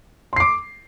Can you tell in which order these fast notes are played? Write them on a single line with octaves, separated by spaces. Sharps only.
C6 C7 D6